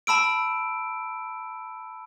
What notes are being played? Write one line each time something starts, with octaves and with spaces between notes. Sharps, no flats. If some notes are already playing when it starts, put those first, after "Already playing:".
A5 B5 E6 D7